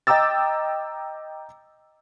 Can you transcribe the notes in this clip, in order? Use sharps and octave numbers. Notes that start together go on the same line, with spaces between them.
D#5 G5 A#5 D6 E6 A6